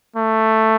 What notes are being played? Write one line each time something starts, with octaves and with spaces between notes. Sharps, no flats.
A3